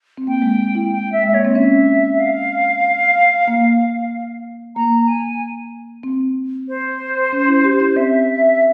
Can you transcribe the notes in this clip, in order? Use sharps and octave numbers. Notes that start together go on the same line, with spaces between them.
C4
A#3 G5
G#3
E4
G5
E5
G#3 E5
A#3 C#5
C4
C#4 E5
F5
A#3
A#3 A#5
G#5
C4
C5
C#4
E4
G4
E4
C4 E5